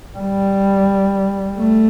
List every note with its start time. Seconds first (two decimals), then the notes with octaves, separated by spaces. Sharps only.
0.18 G3
1.59 A3